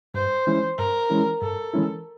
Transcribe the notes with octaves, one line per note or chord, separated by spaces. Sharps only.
G2 C5
E3 G#3 C#4 E4
G2 A#4
E3 G#3 C#4 E4
G2 A4
E3 G#3 C#4 E4